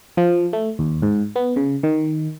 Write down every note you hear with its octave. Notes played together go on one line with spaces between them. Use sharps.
F3
A3
D#2
G#2
B3
C#3
D#3